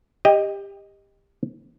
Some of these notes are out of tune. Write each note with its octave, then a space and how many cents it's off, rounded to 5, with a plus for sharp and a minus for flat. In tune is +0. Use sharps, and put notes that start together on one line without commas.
G4 +20 D#5 +0 G#5 -20